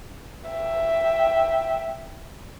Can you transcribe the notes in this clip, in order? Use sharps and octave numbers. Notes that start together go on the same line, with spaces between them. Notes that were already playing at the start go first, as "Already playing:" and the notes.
E5 G5